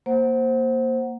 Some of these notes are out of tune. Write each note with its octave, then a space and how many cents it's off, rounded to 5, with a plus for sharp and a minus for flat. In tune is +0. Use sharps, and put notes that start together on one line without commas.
A#3 +0 C5 +5 F#5 +0